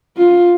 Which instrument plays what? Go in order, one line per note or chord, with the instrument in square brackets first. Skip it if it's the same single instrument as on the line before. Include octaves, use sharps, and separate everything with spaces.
[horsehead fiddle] F4